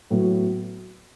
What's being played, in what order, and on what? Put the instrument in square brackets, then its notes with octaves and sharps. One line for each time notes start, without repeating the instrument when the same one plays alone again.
[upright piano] A2 F#3 B3 F#4